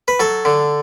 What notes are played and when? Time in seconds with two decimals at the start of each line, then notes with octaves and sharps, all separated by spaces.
0.08 B4
0.19 F#3 A4
0.45 D3